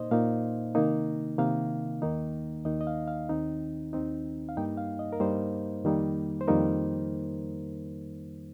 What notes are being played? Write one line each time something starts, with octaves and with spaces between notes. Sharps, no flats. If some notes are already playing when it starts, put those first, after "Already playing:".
Already playing: A#2 A#3 D#4 C5 D#5
A#2 A#3 D#4 F5
C3 D#3 A#3 D#4
C3 D#3 A#3 D#4 F5
D#2 D#3 A#3 D#4
D#2 D#3 A#3 D#4 D#5
D#5
F5
F5
D#2 D#3 C4 D#4
D#2 D#3 C4 D#4
F5
G2 G3 A#3 D#4 G5
F5
D#5
A#4
G2 G3 A#3 D#4 C5
F2 D#3 G3 A#3 D#4
C5
F2 D#3 G3 A#3 D#4 A#4